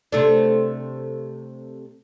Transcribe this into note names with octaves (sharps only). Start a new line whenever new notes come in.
C3 A3 D4